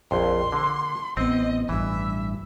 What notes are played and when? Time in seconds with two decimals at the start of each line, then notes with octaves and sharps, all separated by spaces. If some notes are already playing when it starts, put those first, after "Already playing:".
0.11 A#1 F2 C6
0.52 D3 A#3
1.17 A1 B3 C4 D#5
1.69 A1 G2 E3 E5